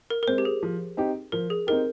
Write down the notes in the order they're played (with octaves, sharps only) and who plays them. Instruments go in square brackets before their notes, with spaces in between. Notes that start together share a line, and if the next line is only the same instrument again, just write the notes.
[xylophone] A#4
A#4
[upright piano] G#3 C4 [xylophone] C5
[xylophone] G4
G#4
[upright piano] F3
C4 D#4 G4
[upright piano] F3 [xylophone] A#4
[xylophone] G#4
[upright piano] C4 D#4 G4 [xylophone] A#4